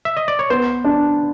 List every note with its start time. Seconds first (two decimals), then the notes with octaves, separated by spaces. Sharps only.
0.05 E5
0.17 D#5
0.28 D5
0.39 C#5
0.50 B3 C5
0.84 D4